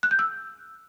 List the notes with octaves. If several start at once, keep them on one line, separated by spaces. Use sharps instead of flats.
F#6
G6
E6